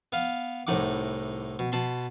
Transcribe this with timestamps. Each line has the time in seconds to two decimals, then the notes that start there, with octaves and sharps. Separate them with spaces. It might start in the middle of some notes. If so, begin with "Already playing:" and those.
0.12 B3 F5
0.67 C2 A2 D#4 F#5 D6
1.59 B2
1.72 B2 A5 B5 C6